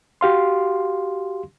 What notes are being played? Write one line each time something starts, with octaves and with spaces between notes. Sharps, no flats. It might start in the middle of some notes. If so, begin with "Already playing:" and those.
F#4 G4 F5 C6